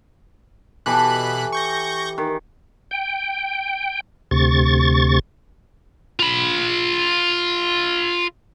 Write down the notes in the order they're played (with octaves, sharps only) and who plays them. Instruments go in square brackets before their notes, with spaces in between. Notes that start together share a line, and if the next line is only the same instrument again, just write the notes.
[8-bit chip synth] B2 B5 F#6 [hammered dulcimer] E3 G4 A4
[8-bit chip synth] C#6 G6 A#6
[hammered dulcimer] D#3
[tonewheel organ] G5
D2 C3 C#6 A6
[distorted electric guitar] F4 B5